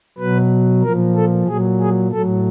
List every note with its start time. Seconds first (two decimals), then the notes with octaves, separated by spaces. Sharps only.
0.18 B2 F#3 B4
0.83 A#2 F3 A#4
1.15 A4
1.47 A#2 F#3 G#4
1.80 G#4
2.12 A2 F#3 A4